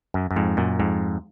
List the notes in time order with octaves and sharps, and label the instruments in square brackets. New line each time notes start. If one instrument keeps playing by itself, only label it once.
[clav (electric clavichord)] F#2
F#2
F2 G#2
F#2 A#2
F2 G#2